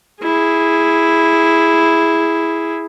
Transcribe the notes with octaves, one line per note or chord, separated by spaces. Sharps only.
E4 G#4